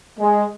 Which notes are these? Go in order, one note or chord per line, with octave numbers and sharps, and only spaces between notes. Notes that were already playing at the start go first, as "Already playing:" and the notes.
G#3